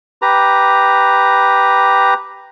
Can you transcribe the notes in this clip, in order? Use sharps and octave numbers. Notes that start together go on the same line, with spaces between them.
G4 B4 A#5